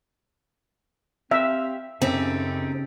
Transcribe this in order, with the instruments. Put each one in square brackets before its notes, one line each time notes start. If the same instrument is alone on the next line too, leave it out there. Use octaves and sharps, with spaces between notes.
[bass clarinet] C4 [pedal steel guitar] G4 F5 [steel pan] E5
[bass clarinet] F#2 [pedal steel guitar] C#3 G4 A4 [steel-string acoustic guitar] C4 D#4